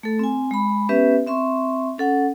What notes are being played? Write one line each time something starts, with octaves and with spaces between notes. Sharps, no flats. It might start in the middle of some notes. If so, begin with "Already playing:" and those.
A3 A4
C4 G#5
G#3 B5
B3 C#4 G4 B4 E5
C4 E5 C6 C#6
C#4 A4 F#5